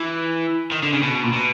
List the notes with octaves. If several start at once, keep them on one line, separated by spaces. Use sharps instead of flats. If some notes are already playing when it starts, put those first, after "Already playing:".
Already playing: E3
D#3
D3
C#3
B2
A#2
B2